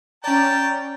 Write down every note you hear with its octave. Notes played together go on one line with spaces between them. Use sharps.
C#4 D5 G5 A5 A#5